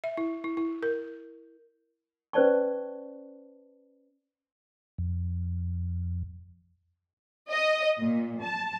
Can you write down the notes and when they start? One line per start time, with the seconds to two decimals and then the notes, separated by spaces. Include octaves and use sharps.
0.04 E5
0.17 E4
0.44 E4
0.57 E4
0.83 A#4
2.33 C#4 B4 C5 D5 A5 C#6
4.98 F2
7.51 D#5
7.99 A#2
8.42 A5